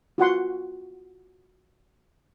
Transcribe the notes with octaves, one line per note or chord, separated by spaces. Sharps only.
F4 F#4 F#5 C6